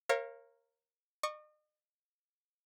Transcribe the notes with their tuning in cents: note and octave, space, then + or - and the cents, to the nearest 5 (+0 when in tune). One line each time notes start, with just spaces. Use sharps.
A#4 +0 C#5 -35 F5 -30
D#5 -40 C#6 +0